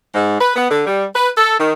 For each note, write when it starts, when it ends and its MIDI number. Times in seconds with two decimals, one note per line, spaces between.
0.14 0.35 44
0.40 0.54 71
0.56 0.70 59
0.70 0.84 50
0.87 1.05 55
1.14 1.29 71
1.37 1.58 69
1.59 1.73 51